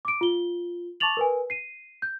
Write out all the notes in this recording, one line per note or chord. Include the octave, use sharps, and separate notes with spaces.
D6 D7
F4 G7
A5 C#6 D6 A6 F7 F#7
A#4 B4 G#5
C7 D#7
G6